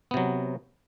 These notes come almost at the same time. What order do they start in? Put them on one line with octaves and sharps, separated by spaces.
B3 C3 F#3